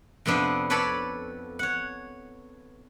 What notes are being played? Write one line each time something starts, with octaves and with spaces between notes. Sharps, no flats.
F2 C3 B3 D4 B4 C6
A4 B4 C#5 D5 A5 B5
C#5 F#5